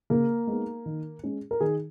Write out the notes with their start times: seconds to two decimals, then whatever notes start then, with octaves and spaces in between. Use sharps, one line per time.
0.10 C#3 A#3 A#4
0.47 G#3 B3 D#4
0.86 D#3
1.23 G#3 C#4
1.51 A#4
1.61 D#3 G#4